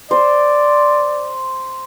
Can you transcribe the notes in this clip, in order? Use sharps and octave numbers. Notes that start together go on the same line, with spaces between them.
C5 D5